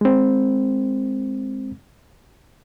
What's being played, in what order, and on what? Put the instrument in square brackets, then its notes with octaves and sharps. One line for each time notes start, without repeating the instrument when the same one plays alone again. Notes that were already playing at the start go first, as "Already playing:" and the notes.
[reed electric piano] G#3 C4